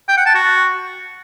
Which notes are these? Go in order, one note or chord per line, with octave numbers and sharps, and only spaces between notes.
G5
F#5
A5
F#4